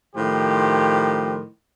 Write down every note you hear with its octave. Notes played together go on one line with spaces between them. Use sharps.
A2 D#3 F3 G4 C5